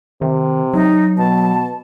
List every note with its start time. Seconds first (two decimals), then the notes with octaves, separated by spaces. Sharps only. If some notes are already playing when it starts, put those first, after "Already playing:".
0.22 C3 D#3
0.73 F#3 D#4
1.18 B2 A5